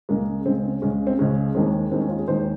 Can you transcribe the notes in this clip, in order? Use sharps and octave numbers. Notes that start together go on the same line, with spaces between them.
C#2 C#3 G#3 A#3
C#2 C#3 G#3 C4
C4
C#2 C#3 G#3 C#4
C4
C#2 C#3 G#3 C#4
D#2 D#3 G#3 C4
D#2 D#3 G#3 C4
C#4
F4
G#4
D#2 D#3 G#3 C5